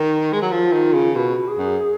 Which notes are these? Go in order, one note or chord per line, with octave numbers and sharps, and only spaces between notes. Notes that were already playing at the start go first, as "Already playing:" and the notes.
Already playing: D#3
G#3
F#3
F3 F4
D#3
C#3
B2 F#4
G#4
F#2